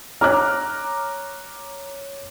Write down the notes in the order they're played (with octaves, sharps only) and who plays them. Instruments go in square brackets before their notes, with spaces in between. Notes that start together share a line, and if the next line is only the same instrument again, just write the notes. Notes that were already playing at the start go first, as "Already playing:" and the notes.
[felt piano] C#5 D6 F#6 [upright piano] A#5 F6